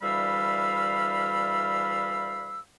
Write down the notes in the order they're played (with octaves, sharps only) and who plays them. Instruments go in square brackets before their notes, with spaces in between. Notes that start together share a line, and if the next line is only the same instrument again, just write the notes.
[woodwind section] D2 E3 G3 F5 B5 E6